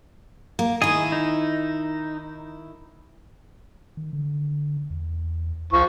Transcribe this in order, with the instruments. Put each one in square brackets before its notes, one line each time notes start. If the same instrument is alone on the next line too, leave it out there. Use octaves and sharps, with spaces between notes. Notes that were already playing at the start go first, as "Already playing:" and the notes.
[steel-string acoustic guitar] A#3
[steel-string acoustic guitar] D#3 E4 [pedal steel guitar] G#4 D#5
[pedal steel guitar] D#4
[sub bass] D#3
D3
E2
[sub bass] C#2 [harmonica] F3 C#6